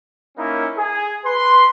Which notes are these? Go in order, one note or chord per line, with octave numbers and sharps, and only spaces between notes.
A#3 C#4 D#4 E4
G#4
B4 C6